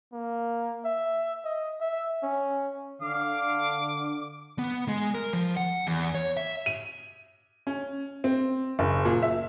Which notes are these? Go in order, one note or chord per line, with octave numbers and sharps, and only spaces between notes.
A#3
E5
D#5
E5
C#4
D3 F5 D6
B3
G#3
A#4
F3
F#5
E2
C#5
E5
D#7
C#4
C4
F#1
A#2
E5